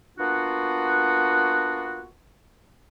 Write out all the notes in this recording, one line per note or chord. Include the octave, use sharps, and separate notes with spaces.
A#3 B3 D4 F4 F#4